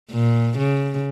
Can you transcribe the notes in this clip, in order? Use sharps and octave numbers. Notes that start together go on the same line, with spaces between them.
A#2
C#3